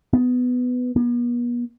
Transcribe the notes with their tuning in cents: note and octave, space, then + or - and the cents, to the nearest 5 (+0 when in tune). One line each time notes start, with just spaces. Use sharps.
B3 +10
B3 -40